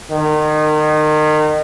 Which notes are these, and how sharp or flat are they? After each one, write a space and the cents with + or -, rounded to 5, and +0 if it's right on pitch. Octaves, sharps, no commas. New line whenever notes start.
D#3 -30